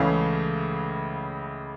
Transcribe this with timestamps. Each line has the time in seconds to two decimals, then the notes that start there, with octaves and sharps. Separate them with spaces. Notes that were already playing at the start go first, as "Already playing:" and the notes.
Already playing: C#2 C#3 E3 A3 C#4 F5